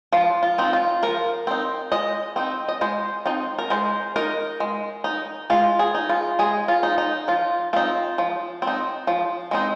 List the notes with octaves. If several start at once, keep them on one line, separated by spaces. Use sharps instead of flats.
F3 F4
F4
C4 D#4
F4
F3 A#4
C4 D#4
G#3 D#5
C4 D#4
D#5
G#3 C5
C4 D#4
A#4
G#3 C5
D#4 A#4
G#3
D#4
G#3 F4
G#4
D#4
F4
G#3 G#4
F4
D#4
D#4
F3 F4
C4 D#4 F4
F3
C4
D#4
F3
G#3 C4 D#4